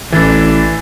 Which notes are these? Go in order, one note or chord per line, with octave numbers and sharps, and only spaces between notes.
A1 E3 D4